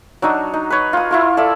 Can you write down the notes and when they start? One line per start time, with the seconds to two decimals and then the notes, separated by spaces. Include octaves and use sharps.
0.22 F#3 D4 D#4 F#4
0.54 D#4
0.70 B4 C#5
0.93 F4 D#6
1.11 E4 F4 A#4
1.37 A4 D5 E5